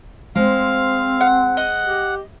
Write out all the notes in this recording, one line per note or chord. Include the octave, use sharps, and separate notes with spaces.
G#3 C4 C5 F5
F#5
D#5 F#5
G4